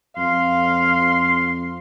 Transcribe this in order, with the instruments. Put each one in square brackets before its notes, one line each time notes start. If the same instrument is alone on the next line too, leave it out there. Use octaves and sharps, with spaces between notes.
[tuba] F2 [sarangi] F5 [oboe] C6